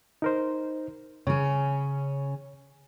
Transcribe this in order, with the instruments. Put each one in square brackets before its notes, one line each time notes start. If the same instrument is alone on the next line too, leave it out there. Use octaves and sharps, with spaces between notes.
[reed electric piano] D#4 A#4 C5
[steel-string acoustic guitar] C#3 C#4 [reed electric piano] C#5